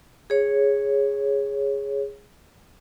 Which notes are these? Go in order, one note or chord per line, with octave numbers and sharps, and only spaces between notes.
G#4 C#5